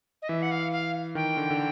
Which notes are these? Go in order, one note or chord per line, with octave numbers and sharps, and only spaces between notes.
D#5
E3 E5
F#5
F5
F5
D#3 G5
D3
D3